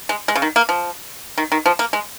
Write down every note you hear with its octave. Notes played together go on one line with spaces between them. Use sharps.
G#3
G#3
C#3
D#3
A#3
F3
D#3
D#3
F3
A#3
G#3